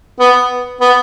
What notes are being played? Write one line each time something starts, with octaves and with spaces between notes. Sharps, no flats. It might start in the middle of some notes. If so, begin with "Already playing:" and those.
B3
B3